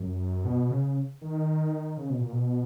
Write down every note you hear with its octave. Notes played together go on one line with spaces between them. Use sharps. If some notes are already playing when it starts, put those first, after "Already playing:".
Already playing: F#2
B2
C#3
D#3
C#3
B2
A#2
B2